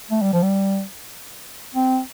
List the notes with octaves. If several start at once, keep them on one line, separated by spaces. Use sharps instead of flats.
A3
G3
F3
G3
C4